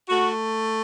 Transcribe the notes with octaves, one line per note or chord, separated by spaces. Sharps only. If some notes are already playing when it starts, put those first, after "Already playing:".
A3 F#4